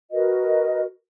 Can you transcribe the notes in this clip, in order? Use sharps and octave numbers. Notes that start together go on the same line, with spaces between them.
F#4 A#4 B4 D#5